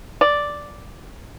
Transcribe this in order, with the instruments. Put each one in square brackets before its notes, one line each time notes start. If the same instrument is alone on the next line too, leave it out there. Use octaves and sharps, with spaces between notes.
[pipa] D5